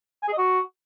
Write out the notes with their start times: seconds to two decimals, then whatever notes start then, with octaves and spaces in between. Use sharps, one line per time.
0.23 G#5
0.28 G#4
0.33 D#5
0.38 F#4